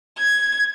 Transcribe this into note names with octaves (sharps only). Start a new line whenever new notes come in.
G#6